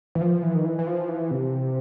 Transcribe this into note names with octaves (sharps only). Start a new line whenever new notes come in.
E3
F3
E3
D#3
E3
E3
F3
E3
C3